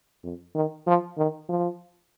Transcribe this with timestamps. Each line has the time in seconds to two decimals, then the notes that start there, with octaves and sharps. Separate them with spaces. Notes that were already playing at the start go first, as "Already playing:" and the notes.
0.24 F2
0.55 D#3
0.87 F3
1.17 D#3
1.49 F3